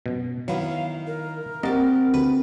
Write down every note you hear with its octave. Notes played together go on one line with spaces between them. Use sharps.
F#2 B2
D#3 F#3 B3 E4 F5
A#4
A#3 C4 G4 D5 D#5
D2 B4